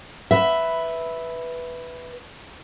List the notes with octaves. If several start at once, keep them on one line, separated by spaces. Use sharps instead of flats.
B4 E5